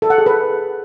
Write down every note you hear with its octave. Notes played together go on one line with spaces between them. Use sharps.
A4
F#5
G#4
B4